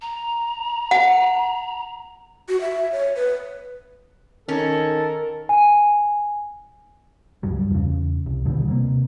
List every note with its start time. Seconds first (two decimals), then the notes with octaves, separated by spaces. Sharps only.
0.02 A#5
0.91 F#5
2.49 F#4
2.61 E5
2.92 C#5
3.16 B4
4.48 D#3 C#4 A4 A#4
5.49 G#5
7.43 C#2 G2 F#3 G3
7.70 E2 C#3
8.26 C2
8.45 D#2 B2 D3 G3
8.68 C3 A#3